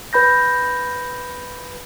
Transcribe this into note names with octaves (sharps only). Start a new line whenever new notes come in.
B4 B5 G6 A#6